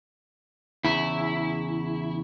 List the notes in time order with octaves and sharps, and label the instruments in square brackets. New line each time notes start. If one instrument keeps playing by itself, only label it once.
[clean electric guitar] E2 C#3 [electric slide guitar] E4